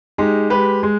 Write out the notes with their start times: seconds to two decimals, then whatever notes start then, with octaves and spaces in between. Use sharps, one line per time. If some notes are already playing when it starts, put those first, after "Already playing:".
0.18 G#3 D#4 G4
0.50 G#3 G4 B4
0.83 G#3